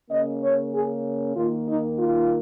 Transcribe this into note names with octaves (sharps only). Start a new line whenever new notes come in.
C#3 A#3 C#4 D#5
C#5
G#4
D#2 D#3 A#3 F4
D#4
F4